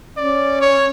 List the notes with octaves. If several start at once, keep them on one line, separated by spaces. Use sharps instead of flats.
C#4 D5
C#5